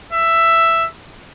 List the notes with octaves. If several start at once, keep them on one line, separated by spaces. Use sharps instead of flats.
E5